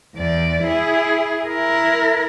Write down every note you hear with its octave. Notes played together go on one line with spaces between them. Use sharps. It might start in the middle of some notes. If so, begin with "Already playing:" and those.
E2 D5
E4 G#4
E4 A#4